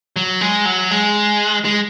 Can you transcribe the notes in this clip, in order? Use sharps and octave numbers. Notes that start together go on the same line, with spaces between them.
F#3
G#3
F#3
G#3
G#3